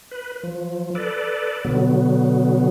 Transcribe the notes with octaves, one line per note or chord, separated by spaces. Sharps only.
B4
F3
A4 B4 D5
B2 D3 F#3 B3